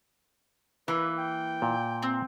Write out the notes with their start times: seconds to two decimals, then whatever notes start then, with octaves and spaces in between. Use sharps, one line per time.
0.88 E3 A#3 B4
1.18 G5
1.62 A#2
2.03 C4